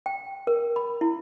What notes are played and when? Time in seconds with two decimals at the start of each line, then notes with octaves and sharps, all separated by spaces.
0.06 G5
0.47 A#4
0.76 B5
1.01 E4